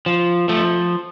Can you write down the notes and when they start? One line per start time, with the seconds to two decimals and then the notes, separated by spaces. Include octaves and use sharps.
0.06 F3
0.49 F3 A3